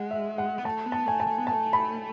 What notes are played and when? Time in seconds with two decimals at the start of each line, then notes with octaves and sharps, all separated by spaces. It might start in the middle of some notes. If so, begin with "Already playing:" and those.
Already playing: G#3 F#5
0.11 E5
0.38 F#5
0.58 B3
0.65 A3 A5
0.86 B3
0.92 A5
1.06 A3 G#5
1.20 A5
1.27 A3
1.39 B3
1.47 A5
1.51 A3
1.73 B5